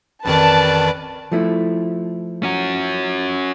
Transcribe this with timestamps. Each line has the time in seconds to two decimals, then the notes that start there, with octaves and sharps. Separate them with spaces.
0.25 A1 F2 D#3 B4 D5 A5
1.32 F3 A3 E4
2.43 C#4 F#4